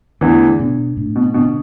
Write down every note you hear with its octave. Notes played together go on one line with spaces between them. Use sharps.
E2 D3 E3 A3 D4
B2 B3 D4
A2 A3 D4
B2
B2 D3 B3 D4